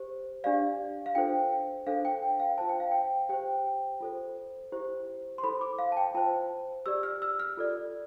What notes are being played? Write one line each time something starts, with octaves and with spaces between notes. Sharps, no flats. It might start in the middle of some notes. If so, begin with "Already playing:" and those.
Already playing: G4 C5
D4 G4 D5 F5
F5
D4 F4 A4 C5 G5
D4 A4 C5 F5
G5
G5
F5
F4 C5 A5
G5
F5
G5
G4 C5 G5
F4 A4 C5
E4 G4 C5
C6
E4 A4 C5 B5
D6
F5
A5
G5
F4 C5 A5
G4 D5 E6
F6
E6
F6
F4 A4 D5